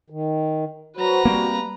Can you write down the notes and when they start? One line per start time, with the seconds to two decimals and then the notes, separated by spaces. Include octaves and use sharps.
0.10 D#3
0.97 F#3 F#4 B4 C5 A#5
1.25 G3 A#3 C4